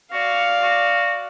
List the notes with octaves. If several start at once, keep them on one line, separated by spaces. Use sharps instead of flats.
F#4 D5 F5
F#4